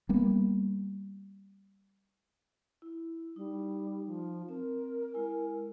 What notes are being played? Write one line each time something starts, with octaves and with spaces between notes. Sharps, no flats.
G3 A#3 B3
E4
G3 D#4
F3
C4 A#4
G#3 E4 G#5